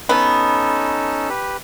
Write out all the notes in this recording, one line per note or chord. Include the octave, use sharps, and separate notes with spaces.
B3 C#4 D#4 A4
G4 B4